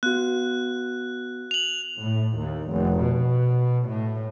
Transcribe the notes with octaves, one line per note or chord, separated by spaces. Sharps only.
B3 F#4 F#6
F7 F#7
A2
D#2
F1
B2
A2